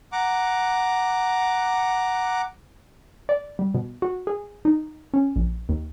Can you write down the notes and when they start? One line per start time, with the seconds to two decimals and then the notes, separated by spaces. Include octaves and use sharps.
0.12 F#5 A#5 D6
3.29 D5
3.59 G3
3.74 B2
4.02 F#4
4.27 G#4
4.65 D#4
5.14 C#4
5.36 A#1
5.69 D#2